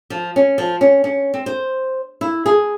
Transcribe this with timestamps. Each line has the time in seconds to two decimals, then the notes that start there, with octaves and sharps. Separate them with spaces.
0.10 F3
0.36 C#4
0.58 F3
0.81 C#4
1.04 C#4
1.34 C4
1.46 C5
2.21 E4
2.46 G#4